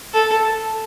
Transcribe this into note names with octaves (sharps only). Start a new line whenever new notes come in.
A4